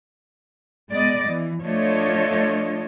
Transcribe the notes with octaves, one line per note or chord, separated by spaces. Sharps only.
G#3 B3 D5 D#5
E3
F3 A3 D4 F4 C#5 D#5